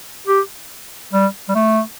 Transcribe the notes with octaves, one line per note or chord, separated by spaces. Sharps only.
G4
G3
G3
A3